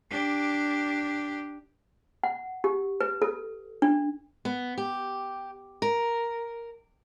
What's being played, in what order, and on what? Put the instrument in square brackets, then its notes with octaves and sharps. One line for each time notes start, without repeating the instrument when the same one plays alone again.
[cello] D4 G4
[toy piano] F#5
G4
B4
A4
D4
[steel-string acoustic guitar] B3
G4
A#4